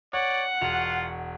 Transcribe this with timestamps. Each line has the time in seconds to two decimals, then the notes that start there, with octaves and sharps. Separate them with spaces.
0.13 C#5 D5 F#5
0.61 E1 F4 F#4 F7